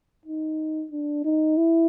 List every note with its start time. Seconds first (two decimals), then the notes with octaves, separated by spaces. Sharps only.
0.26 D#4
0.92 D4
1.25 D#4
1.57 E4